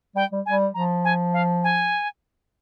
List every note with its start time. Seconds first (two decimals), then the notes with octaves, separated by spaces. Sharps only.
0.16 G3 G5
0.32 G3
0.46 G3 G#5
0.74 F3 A#5
1.04 G#5
1.33 F5
1.64 G#5